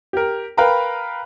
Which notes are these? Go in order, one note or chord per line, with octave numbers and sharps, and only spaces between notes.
G4 A#4
A#4 B4 F5 G5 A#5 B5